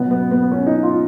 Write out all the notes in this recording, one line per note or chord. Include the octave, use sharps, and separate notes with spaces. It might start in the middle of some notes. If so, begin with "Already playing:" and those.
Already playing: B2 F#3 B3
B3
B3
B3
C#4
D#4
F4